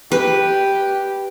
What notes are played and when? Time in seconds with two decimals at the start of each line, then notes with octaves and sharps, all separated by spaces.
0.12 G4 B4